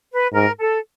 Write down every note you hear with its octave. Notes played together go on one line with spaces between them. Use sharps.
B4
G#2 A#4
A4